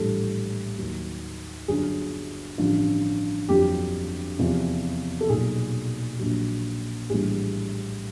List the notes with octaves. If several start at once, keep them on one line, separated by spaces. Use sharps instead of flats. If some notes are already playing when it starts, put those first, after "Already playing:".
Already playing: A#1 A2 E3 G3 A4
D#2 D#3 F#3
G1 F#2 D3 F#3 G#4
A1 G2 D3 F3
G1 F2 D3 F#3 G4
E2 C3 F3
A4
B1 A#2 F#3 G#4
A#1 A#2 F#3
A#1 A2 E3 G3 G#4